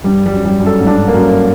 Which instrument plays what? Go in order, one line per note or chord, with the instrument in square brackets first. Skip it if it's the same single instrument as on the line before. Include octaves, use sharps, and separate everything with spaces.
[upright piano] G2 [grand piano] G3
[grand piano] G3
[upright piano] F#2
[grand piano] G3
[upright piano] F#2
[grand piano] A4
[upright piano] G#2
[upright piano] G2 [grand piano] D4
[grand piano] A#3
[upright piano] F#2
[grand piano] A#3